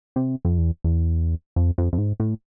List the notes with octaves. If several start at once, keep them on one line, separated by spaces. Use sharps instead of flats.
C3
F2
E2
E2
F2
F2
F2
G#2
A2